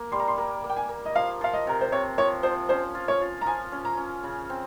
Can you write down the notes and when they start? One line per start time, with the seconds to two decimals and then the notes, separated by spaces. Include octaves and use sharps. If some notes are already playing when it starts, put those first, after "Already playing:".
Already playing: A#3
0.12 G3 C6
0.20 A#5
0.28 C6
0.38 A#3 A#5
0.64 A#3
0.70 G5
0.76 G#5
0.89 A#3
1.05 D#5
1.16 F3 F5
1.41 F3 F5
1.53 D#5
1.67 C3 A#4
1.81 C5
1.92 C3 C#5
2.18 F3 C#5
2.43 F3 C5
2.69 C#4 C5
2.95 F4
3.08 C#5
3.21 F4
3.41 A#5
3.46 F3 G#5
3.72 C#4
3.85 A#5
3.97 C#4
4.24 C#3
4.50 C4